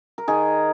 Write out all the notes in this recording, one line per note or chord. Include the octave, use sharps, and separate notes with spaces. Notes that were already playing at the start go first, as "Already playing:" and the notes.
A#4
D#3 G#4